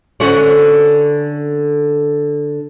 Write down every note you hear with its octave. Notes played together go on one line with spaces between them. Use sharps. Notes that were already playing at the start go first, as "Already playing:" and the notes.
D3 C#4 F#4